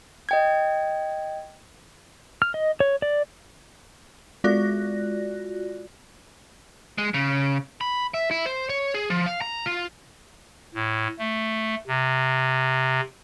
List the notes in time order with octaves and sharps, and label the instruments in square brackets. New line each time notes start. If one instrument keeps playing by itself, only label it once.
[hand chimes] D#5 G5 G#6
[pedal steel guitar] F6
D#5
C#5
D5
[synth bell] G#3 F4 F#4 D5 F#6 A#6
[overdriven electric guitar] G#3
C#3
B5
E5
E4
C5
C#5
G#4
F3
F5
A#5
F4
[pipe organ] A2
A3
C3